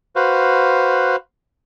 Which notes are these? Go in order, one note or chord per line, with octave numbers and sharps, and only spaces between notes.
F#4 B4 C5 F5